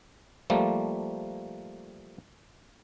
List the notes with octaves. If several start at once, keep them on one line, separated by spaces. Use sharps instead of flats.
F3 G3 A3 A#3